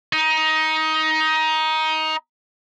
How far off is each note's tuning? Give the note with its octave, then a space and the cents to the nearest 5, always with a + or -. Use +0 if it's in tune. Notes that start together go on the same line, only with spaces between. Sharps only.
D#4 +15